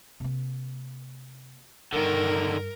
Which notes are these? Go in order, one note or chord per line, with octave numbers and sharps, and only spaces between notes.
C3 A#3
G2 D3 D#3 A#4